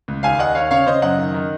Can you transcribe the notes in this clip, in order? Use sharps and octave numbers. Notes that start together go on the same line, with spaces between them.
C#2
D#2 F5 G#5
D#2 D#5 F#5
D#2 C#5 F5
C#3 C#5 F5
C#3 C5 D#5
F#2 D#5 F#5
D#3
D#3